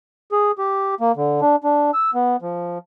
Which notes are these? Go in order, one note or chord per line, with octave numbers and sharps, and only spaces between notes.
G#4
G4
A#3
D3
D4
D4
E6
B3
F3